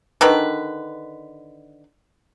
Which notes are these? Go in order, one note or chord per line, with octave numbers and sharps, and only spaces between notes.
D3 D#3 B4